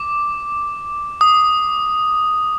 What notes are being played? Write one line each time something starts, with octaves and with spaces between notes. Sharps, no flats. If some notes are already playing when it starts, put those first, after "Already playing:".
Already playing: D6
D#6